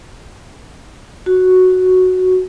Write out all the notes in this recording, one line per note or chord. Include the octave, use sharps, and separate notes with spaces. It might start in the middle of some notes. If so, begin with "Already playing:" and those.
F#4